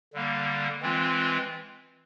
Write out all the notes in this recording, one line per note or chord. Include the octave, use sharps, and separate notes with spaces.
D3 G3 A#3
E3 G#3 C4 F4